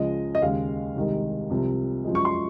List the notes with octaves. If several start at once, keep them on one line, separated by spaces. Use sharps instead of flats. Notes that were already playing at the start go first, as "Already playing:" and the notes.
Already playing: C#2 C#3 F3 G#3 D#5
D#5
D#2 C#3 G#3 F5
C2 C3 D#3 G#3
C2 C3 F3
F#2 F3 G#3
C#6
C6